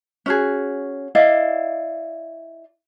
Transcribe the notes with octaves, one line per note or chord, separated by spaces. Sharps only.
C#4 F#4 G#4
E4 D5 D#5 F5